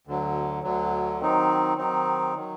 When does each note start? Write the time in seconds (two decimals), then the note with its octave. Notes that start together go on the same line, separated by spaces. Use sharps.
0.07 D2 D3 F#3
0.63 D2 D3 F#3
1.20 D#3 F#3 C4 D#4
1.78 D#3 F#3 C4 D#4
2.36 D#3 F#3